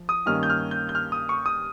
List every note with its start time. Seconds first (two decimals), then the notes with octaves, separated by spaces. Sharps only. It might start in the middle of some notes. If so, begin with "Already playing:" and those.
Already playing: F3
0.09 D#6
0.26 G2 D#3 A#3 C#4 F6
0.43 G6
0.50 F6
0.71 G6
0.89 G6
0.95 F6
1.12 D#6
1.29 C#6
1.46 D#6